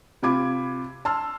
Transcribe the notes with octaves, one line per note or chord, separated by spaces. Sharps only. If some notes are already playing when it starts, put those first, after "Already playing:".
C3 F4 B5 D6 G#6 D7
A5 C6 E6 F6